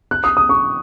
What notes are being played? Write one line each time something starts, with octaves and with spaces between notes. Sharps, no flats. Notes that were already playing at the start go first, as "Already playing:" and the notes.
F#6
D#6
D#6
C#6